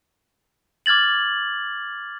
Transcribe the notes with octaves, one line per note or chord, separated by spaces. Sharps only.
D6 F6 G#6 A6 F#7